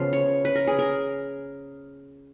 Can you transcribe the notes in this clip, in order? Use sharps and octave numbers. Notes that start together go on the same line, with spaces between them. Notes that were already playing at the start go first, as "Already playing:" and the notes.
Already playing: C#3 F3 B3 F5
C#5
B4
A#4
G#4
A#4